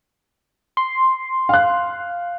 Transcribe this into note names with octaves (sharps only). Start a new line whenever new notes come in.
C6
F5 F#6